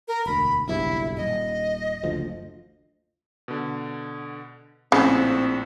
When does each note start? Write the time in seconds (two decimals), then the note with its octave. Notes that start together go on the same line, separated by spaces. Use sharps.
0.08 A#4
0.26 E1 D2 B5
0.67 F#1 B1 G2 E4
1.17 D#1 D#5
2.03 F#1 D2 F3
3.48 B2 D3
4.92 A#1 A2 C#3 C4